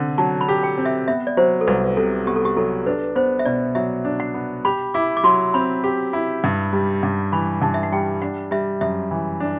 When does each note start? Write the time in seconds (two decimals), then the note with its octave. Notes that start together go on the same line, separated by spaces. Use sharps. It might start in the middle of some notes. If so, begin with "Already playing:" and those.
Already playing: D3 C4
0.18 F#3 A5
0.41 B5
0.48 G4
0.63 G5
0.78 C4
0.86 E5
1.08 B3 E5
1.27 D5
1.37 F#3 C5
1.61 A4
1.67 C2 B4
1.97 C3 A4
2.27 B3 G4
2.36 A4
2.45 G4
2.56 F#3 A4
2.86 D4 B4
3.15 B3 C5
3.39 E5
3.45 B2 D5
3.75 F#3 E5
4.05 D4
4.20 F#5
4.34 B3
4.65 G4 B5
4.94 E4 D6
5.17 D6
5.24 F#3 C6
5.54 C4 B5
5.84 G4
6.13 E4
6.44 G2
6.73 G3
7.03 G2
7.32 E3 B5
7.62 G2 A5
7.74 E5
7.83 F#5
7.92 G3 G5
8.22 D4 F#5
8.51 G3 E5
8.81 F#2 E5
9.11 E3
9.40 D4